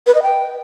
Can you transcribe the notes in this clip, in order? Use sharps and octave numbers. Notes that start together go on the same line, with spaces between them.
B4
D#5
G5